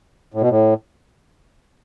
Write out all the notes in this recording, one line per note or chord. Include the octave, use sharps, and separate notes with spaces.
A2
B2
A2